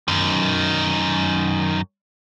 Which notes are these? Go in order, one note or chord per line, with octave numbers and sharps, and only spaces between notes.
F#2 D#3